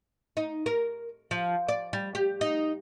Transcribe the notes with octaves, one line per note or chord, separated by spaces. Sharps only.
D#4
A#4
F3
D5
G3
G4
D#4